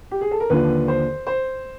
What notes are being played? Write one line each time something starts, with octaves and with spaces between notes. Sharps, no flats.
G4
G#4
A4
A#4
D#2 D3 F3 B4
C5
C5